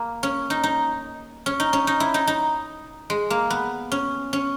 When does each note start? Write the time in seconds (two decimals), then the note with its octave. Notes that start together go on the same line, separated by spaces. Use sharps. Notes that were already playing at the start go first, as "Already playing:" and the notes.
Already playing: A#3
0.23 C#4
0.50 D#4
0.63 D#4
1.46 C#4
1.60 D#4
1.73 C#4
1.87 D#4
2.00 E4
2.14 D#4
2.27 D#4
3.10 G#3
3.30 A#3
3.50 B3
3.92 C#4
4.33 C#4